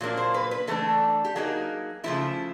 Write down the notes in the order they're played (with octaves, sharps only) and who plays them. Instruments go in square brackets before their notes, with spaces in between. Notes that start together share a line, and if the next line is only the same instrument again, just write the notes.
[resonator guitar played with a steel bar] A#2 F#3 A#3 D4
C5
B4
B4
E3 A3 D4 A4
G4
F#3 A#3 D#4 G#4
C#3 F3 A3 E4